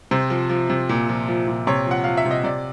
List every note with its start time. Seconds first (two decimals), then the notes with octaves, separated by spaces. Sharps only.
0.11 C3 C5
0.30 F3
0.50 F3
0.70 C3
0.89 A#2
1.09 F3
1.28 F3
1.47 A#2
1.67 C3 C#5
1.86 F3 F#5
2.04 F3 F5
2.17 E5
2.25 C3
2.31 D#5
2.44 C3 D5